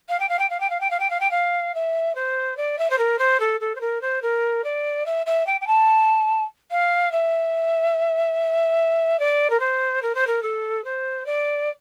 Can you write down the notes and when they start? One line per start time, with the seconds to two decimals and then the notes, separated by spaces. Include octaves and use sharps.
0.09 F5
0.20 G5
0.29 F5
0.39 G5
0.50 F5
0.60 G5
0.70 F5
0.80 G5
0.90 F5
1.00 G5
1.10 F5
1.20 G5
1.31 F5
1.74 E5
2.15 C5
2.57 D5
2.78 E5
2.90 C5
2.98 A#4
3.18 C5
3.40 A4
3.60 A4
3.75 C5
3.80 A#4
4.01 C5
4.22 A#4
4.64 D5
5.06 E5
5.26 E5
5.46 G5
5.61 G5
5.67 A5
6.71 F5
7.12 E5
9.19 D5
9.50 A#4
9.59 C5
10.02 A#4
10.15 C5
10.27 A#4
10.42 A4
10.84 C5
11.26 D5